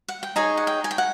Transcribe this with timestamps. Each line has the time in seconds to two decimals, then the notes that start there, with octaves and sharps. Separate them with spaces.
0.08 F#5
0.23 G5
0.36 D#4 G#4 C#5 G#5
0.57 F#5
0.67 G5
0.84 G#5
0.91 G5
0.98 F#5